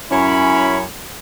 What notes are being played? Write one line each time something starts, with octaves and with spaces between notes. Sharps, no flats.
F#2 C#4 E4 C#5 B5